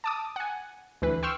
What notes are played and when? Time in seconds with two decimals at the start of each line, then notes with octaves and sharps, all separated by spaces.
0.04 A5 D6 D#6
0.36 F#5 G#5
1.02 D2 E3 B4
1.23 G5 C6 C#6 E6 F6